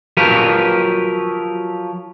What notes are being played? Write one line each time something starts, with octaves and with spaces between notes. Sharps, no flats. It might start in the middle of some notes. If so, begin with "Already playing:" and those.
F3 F#3 G4 A#4 B4